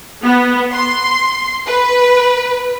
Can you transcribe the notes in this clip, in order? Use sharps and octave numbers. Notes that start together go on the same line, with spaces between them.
B3
C6
B4